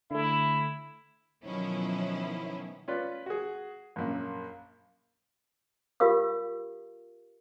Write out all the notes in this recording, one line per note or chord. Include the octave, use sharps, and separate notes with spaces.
D3 A3 E4
B2 D#3 F3 F#3 C#4 E4
C#4 F4 B4 D5
F#4 G#4
A#1 F#2 A#3
F4 G4 A#4 F5 D#6